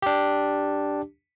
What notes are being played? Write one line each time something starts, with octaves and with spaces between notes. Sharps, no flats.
D4 G4